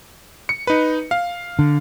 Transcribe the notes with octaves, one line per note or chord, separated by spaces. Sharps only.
C#7
D#4 B4
F5
D3